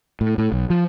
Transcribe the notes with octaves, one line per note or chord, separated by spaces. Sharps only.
A2
A2
B1
F3